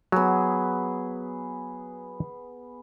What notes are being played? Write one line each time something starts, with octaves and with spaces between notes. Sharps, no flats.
F#3 B3 G#4